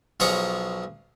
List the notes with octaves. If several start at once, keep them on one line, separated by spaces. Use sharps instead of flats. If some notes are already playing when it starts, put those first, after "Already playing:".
B1 F3 G#4 C#5 A#5 C#6